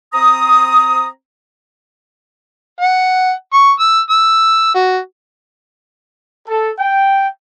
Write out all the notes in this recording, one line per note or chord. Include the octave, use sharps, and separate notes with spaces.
C4 A#5 D#6
F#5
C#6
E6
E6
F#4
A4
G5